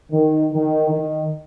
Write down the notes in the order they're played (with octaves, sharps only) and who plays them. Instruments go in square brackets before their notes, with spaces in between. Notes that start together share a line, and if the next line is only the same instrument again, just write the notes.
[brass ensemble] D#3
D#3
D#3